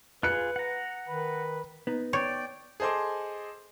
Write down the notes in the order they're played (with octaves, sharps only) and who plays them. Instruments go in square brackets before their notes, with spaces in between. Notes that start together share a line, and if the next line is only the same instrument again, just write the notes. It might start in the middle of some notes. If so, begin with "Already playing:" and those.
[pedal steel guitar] F4 G#4 [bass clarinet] B4 [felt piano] F#6 C#7
[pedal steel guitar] F#5 A#5
[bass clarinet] D#3 [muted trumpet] B4
[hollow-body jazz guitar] B3 D#4
[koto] C#5 [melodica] D5 G5
[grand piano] G#4 A4 C5 D#5 C6 D6